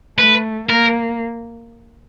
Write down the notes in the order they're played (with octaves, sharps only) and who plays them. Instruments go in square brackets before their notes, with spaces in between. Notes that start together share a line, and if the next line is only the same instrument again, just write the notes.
[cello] A3 [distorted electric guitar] B4
[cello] A#3 [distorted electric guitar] A#4